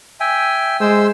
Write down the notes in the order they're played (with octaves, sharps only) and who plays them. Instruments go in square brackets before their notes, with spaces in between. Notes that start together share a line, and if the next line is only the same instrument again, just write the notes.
[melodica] E5 G5 G#5
[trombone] G#3 [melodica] C5 C6 E6